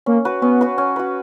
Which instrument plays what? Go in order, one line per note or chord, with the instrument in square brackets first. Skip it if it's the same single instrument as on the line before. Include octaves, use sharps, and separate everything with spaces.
[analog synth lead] A#3 [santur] C#4
[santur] F#4 B4
[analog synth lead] B3 [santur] C#4
[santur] F#4 B4
C#4
F#4 B4